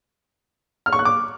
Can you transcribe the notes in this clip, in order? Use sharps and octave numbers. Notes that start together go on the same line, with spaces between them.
F6
C#6
F#6
D6